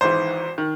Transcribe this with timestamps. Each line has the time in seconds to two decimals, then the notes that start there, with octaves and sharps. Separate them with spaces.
0.01 G#1 G#2 E3 C5
0.58 D#3